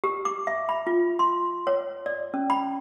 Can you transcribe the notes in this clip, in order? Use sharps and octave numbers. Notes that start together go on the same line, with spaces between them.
G4
D6
E5
B5
F4
C6
C#5
D5
C#4
B5